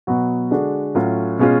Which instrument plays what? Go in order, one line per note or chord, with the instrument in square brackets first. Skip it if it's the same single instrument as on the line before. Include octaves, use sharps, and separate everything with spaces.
[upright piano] B2 F#3 B3 F#4
D3 G#3 D4 F#4
A2 F#3 C#4 F4
B2 G#3 C#4 F4